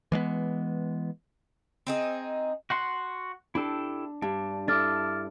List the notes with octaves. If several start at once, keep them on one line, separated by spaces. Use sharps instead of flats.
E3 G#3 A3 B3
C4 D#4 G#4
F#4 F#5 C6
D4 E4 G4 A4
G2 D4
D4 E4 A4 D6 F6 A6